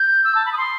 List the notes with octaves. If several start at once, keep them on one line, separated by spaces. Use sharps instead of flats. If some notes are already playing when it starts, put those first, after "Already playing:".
Already playing: G6
E6
A5
B5
D#6
C6